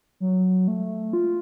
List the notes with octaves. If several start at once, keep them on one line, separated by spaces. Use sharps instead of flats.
F#3
A3
F4